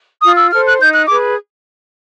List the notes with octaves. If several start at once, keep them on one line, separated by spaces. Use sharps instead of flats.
F4 D#6
E6
A4 C5 F6
F#6
D#4 G6
F#6
G#4 B4 D6